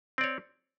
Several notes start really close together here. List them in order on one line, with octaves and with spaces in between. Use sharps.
C4 D5 C#5